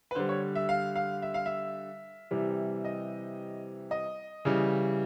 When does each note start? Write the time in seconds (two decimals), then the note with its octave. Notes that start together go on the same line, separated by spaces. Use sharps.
0.11 B4
0.15 D3 G3 C5
0.29 C#5
0.55 E5
0.69 F5
0.96 F5
1.22 E5
1.34 F5
1.46 E5
2.31 C3 E3 G3
2.85 D#5
3.91 D#5
4.45 C#3 E3 G3